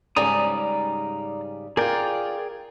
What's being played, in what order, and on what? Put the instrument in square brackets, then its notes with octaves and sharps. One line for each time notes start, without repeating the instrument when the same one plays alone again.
[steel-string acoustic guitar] G#2 C#3 G3 [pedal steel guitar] D5 A#5 D#6
[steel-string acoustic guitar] F4 A#4 [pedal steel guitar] G#4 D5 G5